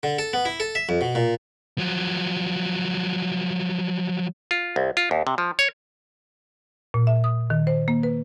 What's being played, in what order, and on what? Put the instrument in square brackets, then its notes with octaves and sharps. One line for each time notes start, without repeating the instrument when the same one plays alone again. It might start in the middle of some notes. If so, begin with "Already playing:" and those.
[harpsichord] D3
A4
B3
E4
A4
E5
F2
B2
A#2
[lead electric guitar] F3 F#3
[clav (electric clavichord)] F4
C2
F4
D#2
C3
F3
C#5
[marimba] A#2
E5
D#6
D#3
C5
A#3
B4